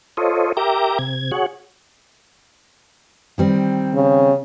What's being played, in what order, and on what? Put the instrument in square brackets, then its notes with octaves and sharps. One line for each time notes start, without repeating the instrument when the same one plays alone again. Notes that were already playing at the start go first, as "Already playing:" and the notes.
[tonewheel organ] F4 A4 C5 C#5 D#5
G4 A#4 E5 G5 A#5 D6
C3 G#6
F#4 G#4 C#5 F#5
[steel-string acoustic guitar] D#3 G3 C4
[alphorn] C#3